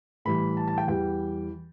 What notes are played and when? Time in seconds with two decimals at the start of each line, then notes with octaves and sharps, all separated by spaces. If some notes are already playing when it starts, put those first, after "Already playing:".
0.25 A2 E3 G3 B5
0.57 A5
0.68 A5
0.78 G5
0.88 E2 E3 G3 G5